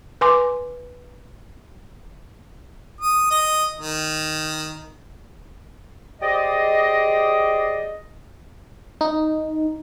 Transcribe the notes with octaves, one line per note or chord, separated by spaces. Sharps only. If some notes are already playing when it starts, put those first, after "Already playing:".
B4 G#5 C6 D6
D#6
D#5
D#3
G4 G#4 C5 D5 D#5
D#4